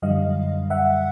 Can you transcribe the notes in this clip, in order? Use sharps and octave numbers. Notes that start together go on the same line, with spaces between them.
F#2 D3 G3 D#5 F5
E5 F#5